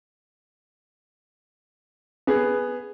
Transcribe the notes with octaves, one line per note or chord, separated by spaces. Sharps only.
B3 G#4